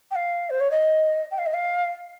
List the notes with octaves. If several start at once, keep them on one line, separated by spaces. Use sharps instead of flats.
G5
F5
C5
C#5
D#5
G5
F5
D#5
F5